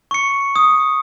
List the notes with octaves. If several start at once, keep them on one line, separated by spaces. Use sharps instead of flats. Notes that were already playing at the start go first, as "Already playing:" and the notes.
C#6 C#7
D#6